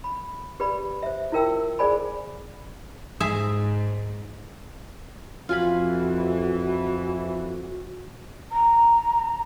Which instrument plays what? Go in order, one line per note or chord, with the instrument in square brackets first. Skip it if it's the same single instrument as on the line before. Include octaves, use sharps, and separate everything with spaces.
[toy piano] B5
G4 B4 D5 B5
C5 E5
E4 F4 A#4 G5 E6
G#4 C5 D5 G#5 B5
[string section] G#2 [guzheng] G#4 E5
[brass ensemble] F2 E3 [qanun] F4 G#5 B5 [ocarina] F#4
[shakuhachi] A#5